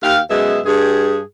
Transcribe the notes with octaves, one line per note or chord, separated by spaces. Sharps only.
D#2 G4 F5
F#2 B2 G#3 G#4 E5
G2 G#4